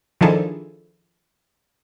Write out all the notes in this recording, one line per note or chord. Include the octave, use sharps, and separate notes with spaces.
D#3 F3 D4 E4 G#4 A4